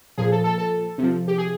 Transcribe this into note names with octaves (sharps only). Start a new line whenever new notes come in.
A#2 F3 G#4
A4
A4
A4
C3 F3
G4
G#4